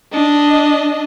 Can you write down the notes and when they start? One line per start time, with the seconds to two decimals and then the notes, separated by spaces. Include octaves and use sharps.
0.13 D4 D#5